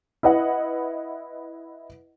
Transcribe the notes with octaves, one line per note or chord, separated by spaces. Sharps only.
E4 B4 D#5 F#5